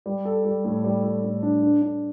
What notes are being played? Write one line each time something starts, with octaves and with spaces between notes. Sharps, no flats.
G3
A4
G3
A2
G3
G3
A2
D4
D4
D4